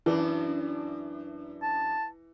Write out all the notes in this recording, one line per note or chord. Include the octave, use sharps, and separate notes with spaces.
F#2 E3 D4
A5